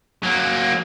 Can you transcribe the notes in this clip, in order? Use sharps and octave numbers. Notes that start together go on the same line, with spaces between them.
F#3 A#3